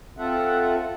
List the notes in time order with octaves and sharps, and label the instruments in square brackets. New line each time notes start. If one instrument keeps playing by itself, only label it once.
[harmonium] C4 F4 A4 E5 F#5